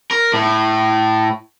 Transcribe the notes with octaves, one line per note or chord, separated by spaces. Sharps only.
A#4
A2